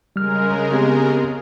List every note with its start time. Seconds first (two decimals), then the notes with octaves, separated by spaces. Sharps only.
0.16 C#3 G3 G#3 A#4 F6
0.71 B3 C4 G4